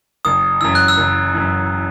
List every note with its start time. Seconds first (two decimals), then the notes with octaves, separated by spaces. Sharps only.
0.25 F#1 D#6
0.61 F#2 E3 E6
0.75 F#6
0.88 E6
0.97 F#1
1.34 F#2 E3